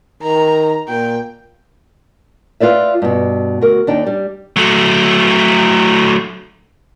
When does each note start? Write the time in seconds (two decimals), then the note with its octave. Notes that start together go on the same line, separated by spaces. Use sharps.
0.23 D#3 A#5
0.89 A#2 G5
2.60 F4 B4 D5 E5
3.02 G2 B2
3.61 D2 F#4 A#4
3.87 D#2 D4 D#4 G5
4.06 G3
4.56 F#3 A3